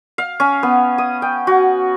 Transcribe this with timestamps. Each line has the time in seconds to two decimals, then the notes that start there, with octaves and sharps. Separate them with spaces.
0.18 F5
0.40 C#4
0.63 B3
0.98 D#6
1.22 G5
1.47 F#4